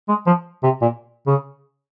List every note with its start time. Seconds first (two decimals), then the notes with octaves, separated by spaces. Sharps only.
0.08 G#3
0.27 F3
0.63 C3
0.82 A#2
1.27 C#3